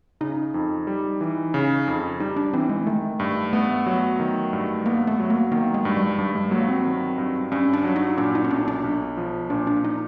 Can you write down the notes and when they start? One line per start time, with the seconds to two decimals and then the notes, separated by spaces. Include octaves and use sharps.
0.21 C#3 D#4
0.54 F2
0.87 G3
1.21 E3
1.54 C#3
1.88 F2
2.20 G3 D#4
2.36 D4
2.53 E3 C4
2.69 G#3
2.87 D#3 A3
3.20 G2
3.53 A3 B3
3.86 F#3
4.20 D#3
4.53 G2
4.86 A#3 B3
5.07 A3
5.20 F#3
5.30 A#3
5.52 D#3 A#3
5.74 G#3
5.85 G2
5.97 G3
6.19 G2 G3
6.35 G#3
6.51 F#3 A#3
6.69 C4
6.85 D#3
7.18 G2
7.52 G2 C#4
7.73 D4
7.84 F#3
7.96 D#4
8.17 A#2 D4
8.35 D#4
8.44 C#4
8.51 B1 D4
8.68 D4
8.84 B1
9.17 F3
9.50 A#2 D4
9.67 D4
9.84 D#4